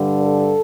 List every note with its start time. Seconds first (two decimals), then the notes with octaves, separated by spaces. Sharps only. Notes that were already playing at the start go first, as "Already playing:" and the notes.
Already playing: G2 D3 G3
0.22 A4